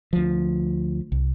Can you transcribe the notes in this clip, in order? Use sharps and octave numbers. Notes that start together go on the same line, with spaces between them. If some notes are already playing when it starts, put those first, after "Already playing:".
D2 F3
C2